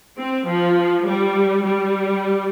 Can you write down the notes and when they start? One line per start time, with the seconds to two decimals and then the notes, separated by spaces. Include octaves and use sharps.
0.17 C4
0.46 F3
1.06 G3
1.64 G3